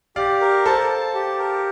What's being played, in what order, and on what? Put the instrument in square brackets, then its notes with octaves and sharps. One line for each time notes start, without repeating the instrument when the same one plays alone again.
[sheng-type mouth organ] G4 [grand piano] D5 F5
[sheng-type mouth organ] A#4
[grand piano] A4 C5 [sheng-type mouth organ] A5
[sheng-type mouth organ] A5
G4
A#4